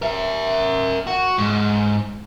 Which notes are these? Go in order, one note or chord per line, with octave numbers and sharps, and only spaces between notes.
A#4 E5
F#4
G#2